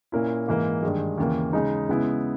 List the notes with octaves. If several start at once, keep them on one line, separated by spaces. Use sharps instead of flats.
A#2 A#3 C#4 E4
G#2 E3 A#3
G2 D#3 G#3
D#2 C#3 E3 A#3
C#3 G#3 D#4
C#3 G#3 B3 E4